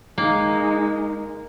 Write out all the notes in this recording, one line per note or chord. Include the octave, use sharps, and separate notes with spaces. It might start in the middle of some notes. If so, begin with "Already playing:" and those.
G#3 A#3 D#4